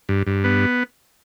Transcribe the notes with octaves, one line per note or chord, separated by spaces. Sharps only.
G2
G2
B3